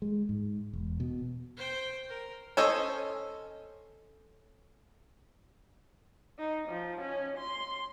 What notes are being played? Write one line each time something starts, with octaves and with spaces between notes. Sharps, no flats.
G#3
G#2
E1
B2
C5 G5
A#4
C#4 A4 C5 C#5 D#5
D#4
F3
C#4
C6